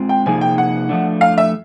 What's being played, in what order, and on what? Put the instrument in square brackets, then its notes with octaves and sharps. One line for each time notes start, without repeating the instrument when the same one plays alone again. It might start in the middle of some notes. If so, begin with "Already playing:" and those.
Already playing: [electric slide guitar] G#3 C4 F4
[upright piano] G5
[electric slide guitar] C3 F3 A#3 D#4 G#4 [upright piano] G#5
[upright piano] G5
F#5
[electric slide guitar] F3 A3 D4
[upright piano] F5
E5